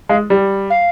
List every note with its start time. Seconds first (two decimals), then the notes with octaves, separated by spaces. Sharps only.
0.09 G#3 F5
0.30 G3
0.70 F5